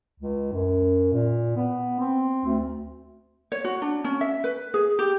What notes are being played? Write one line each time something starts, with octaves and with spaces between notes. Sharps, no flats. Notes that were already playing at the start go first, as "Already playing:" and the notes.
C#2
F#2
A#2
B3
C4
D2
C#5
F#4
D4
C#4
E5
B4
G#4
G4